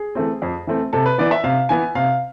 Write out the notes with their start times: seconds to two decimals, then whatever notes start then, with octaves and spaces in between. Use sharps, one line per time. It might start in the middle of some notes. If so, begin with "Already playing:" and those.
Already playing: G#4
0.15 E3 A3 C4
0.42 F2
0.67 E3 A3 C4
0.93 C3 A4
1.06 B4
1.18 E3 B3 D5
1.31 E5
1.43 C3 F5
1.69 E3 B3 G#5
1.95 C3 F5